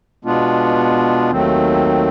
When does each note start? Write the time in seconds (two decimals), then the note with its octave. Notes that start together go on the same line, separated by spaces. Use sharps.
0.25 B2 G#3 B3 D4 F4
1.30 D#2 D#3 F#3 A3 C4